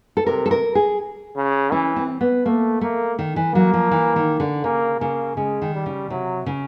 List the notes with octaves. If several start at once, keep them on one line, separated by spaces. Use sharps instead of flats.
A4
C3 A#4
A4
A#4
G#4
C#3
E3 C#4
C4
B3
A3 A#3
A3 A#3
D#3
E3
F#3 A#3
F3
E3
D#3
D3
C#3 A#3
C#3 A#3
C#3 G#3
D#3
G3
C#3
C3 F#3
C#3